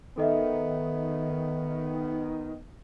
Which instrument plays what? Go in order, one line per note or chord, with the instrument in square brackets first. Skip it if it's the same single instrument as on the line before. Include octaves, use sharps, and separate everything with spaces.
[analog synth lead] D#3 [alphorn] B3 [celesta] A4 D#5 E5